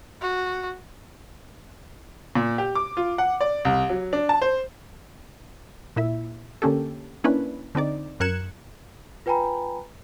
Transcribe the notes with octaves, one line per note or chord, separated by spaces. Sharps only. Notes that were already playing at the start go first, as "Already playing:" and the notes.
F#4
A#2
G4
D6
F4
F#5
D5
C2
F#3
D4
A5
C5
A#2 E4 E5
D3 A#3 C#4 G4 A4
A#3 C#4 D4 E4 B4
D3 C4 D#4 D5
F#2 A#4 F#6 G#6 C#7 E7
F4 B4 G5 G#5 A#5 B5